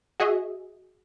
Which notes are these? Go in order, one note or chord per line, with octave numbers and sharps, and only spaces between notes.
F#4 G#4 D#5 E5